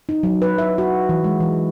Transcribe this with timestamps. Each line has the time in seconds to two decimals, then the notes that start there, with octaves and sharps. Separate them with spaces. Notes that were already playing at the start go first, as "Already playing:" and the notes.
0.09 D#4
0.23 F#3
0.42 B4
0.58 E5
0.78 F#4
1.09 E3
1.24 G#3
1.40 E3